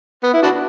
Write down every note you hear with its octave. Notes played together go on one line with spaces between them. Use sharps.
B3
E4
D4 F#4